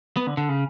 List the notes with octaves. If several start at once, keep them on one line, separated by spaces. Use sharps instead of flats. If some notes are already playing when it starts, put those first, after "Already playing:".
B3
D3
D3
C#3